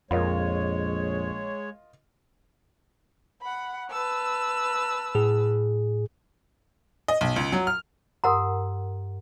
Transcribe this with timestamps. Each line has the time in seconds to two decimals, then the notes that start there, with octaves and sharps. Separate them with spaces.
0.11 A#1 F2 G#3 F4 A#4 C#5 D#5
3.41 F#5 B5
3.89 B4 A5 E6
5.15 A2 G#4
7.08 D#5
7.21 B1
7.36 C#2
7.52 F#3
7.67 F6
8.24 G2 A#4 F#5 A#5 C6 D#6